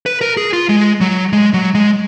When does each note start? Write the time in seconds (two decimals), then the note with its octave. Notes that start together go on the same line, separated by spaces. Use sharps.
0.06 B4
0.21 A#4
0.37 G#4
0.53 F4
0.69 G#3
1.01 F#3
1.33 G#3
1.54 F#3
1.75 G#3